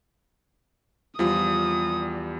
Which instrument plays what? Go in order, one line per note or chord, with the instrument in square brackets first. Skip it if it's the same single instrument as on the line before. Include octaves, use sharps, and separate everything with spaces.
[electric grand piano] E2 G3 [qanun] F3 [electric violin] D#6